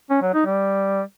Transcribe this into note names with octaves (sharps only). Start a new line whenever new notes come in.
C#4
F#3
D#4
G3